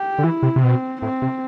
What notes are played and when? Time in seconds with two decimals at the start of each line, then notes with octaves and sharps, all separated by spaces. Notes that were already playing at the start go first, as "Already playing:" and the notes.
Already playing: G4
0.19 D3
0.24 E3 E4
0.43 C3
0.56 C3
0.63 B2 C4
1.02 A2 C4
1.22 C3